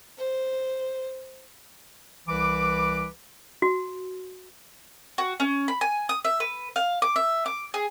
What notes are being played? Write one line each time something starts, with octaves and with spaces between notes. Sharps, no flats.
C5
C2 E3 B4 D6
F#4
F#4
C#4
B5
G#5
D#6
E5
B4
F5
D6
E5
D6
G#4